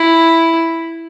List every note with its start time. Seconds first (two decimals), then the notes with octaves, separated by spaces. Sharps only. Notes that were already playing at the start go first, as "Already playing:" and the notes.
Already playing: E4